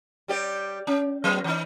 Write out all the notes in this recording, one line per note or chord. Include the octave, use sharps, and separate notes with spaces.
G3 G4 D5
C#4
F#3 B3
E3 D#4